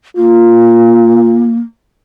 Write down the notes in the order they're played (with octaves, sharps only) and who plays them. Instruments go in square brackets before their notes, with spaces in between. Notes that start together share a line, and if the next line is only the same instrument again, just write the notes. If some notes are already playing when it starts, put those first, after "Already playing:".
[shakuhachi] A#3 [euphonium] F4